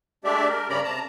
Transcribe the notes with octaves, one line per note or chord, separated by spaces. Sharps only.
G#3 A3 D4 G4 D5 E5
A#4
G2 C#3 C#4 D5 A#5 B5
C3 A5 A#5